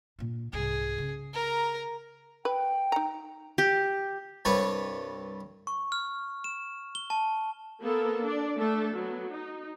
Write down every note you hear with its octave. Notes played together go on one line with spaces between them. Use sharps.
A#2 D4
C2 G#2 G#4
C#3
A#4 A#5
B4 G5
D#4 A#5
G4
C2 G2 D4 B4 C#5
C#6
F6
E7
G7
A5
A#3 B3 A4 A#4
D4 D5
A3 D4 A4
F#3 B3
D#4